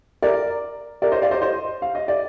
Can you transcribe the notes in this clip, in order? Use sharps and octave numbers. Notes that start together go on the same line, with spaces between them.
A#4 D5
A#4 D5
C5 D#5
D5 F5
C5 D#5
C5 D#5
F5
D#5
D5